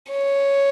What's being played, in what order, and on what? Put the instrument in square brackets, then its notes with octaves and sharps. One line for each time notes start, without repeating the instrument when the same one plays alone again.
[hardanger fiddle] C#5